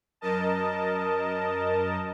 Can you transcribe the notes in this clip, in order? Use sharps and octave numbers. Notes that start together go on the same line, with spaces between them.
F#2 A#4 D#5 A5